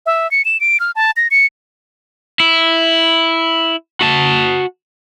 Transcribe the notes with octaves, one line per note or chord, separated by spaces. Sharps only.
E5
C#7
E7
D7
F6
A5
A#6
C#7
E4
F#4 A5